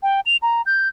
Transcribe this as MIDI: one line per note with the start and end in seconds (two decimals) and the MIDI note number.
0.03 0.20 79
0.26 0.37 101
0.42 0.62 82
0.66 0.88 91